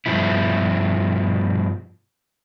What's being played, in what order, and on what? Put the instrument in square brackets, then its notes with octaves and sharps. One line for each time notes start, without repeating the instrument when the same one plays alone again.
[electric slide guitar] G2 B2 F3 E4